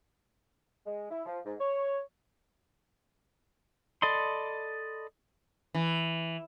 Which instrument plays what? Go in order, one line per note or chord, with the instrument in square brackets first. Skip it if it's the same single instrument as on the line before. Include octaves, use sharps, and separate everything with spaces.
[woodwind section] G#3
E4
F3
G#2
C#5
[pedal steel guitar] A4 D5 D#5 B5 C6
[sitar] E3